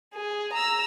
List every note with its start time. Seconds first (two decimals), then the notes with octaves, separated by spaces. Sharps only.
0.15 G#4
0.53 A#5 E6